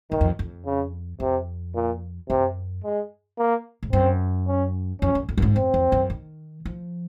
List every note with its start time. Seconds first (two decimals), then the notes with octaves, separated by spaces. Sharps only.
0.11 F#2 D#3
0.21 F2
0.39 F2
0.65 C#3
1.20 F2 C3
1.75 A#2
2.29 F#2 C3
2.84 G#3
3.38 A#3
3.83 G#2
3.92 F#2 C4
4.47 C#4
5.01 F2 C#4
5.15 F#2
5.29 F2
5.38 F#2
5.42 G#2
5.55 F#2 C4
5.74 F2
5.92 F#2
6.10 D#3
6.65 F3